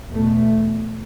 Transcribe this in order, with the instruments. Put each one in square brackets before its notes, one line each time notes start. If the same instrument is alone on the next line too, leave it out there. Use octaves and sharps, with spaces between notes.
[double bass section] E2 B2 A3